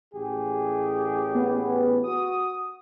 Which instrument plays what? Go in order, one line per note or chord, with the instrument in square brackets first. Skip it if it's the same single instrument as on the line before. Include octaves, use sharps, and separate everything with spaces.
[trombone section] A1 G4 G#4
[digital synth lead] B3
[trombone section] F#4 [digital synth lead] D#6